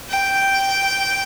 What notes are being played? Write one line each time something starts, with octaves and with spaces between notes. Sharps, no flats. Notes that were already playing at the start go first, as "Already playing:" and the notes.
G5